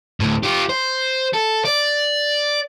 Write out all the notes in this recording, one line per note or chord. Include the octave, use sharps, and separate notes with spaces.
D2 A2
F4 G4
C5
A4
D5